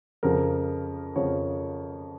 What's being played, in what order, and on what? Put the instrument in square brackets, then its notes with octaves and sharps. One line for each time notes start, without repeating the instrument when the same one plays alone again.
[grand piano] F2 C#3 F3 A#4
F2 C#3 F3 C#5